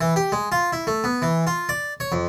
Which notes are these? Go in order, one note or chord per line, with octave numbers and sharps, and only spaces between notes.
E3
G4
G#3
F4
E4
A3
B3
E3
F4
D5
C#5
F2